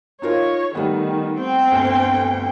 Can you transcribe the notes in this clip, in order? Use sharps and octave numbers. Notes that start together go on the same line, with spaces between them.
D#4 F4 A#4 C#5
D#3 G3 A3 B3
C4 G5
G1 D2